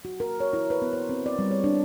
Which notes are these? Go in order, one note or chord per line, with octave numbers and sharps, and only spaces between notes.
F#4
A#4
C#5
E4
B4
B3
C5
C4
D5
G3
C#5
D4